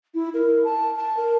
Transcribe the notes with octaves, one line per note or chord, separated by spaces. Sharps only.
E4
A#4
A5
A5
A#4